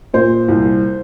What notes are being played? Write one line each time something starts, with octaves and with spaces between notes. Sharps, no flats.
A#2 C5
C2